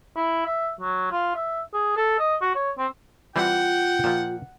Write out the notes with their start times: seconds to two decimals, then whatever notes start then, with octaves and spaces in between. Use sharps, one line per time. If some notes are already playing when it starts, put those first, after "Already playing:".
0.16 E4
0.46 E5
0.81 F#3
1.12 F4
1.35 E5
1.74 G#4
1.97 A4
2.19 D#5
2.42 F#4
2.55 C#5
2.78 C4
3.36 E3 G3 C4 F4 F#5 G5
4.04 A#2 F3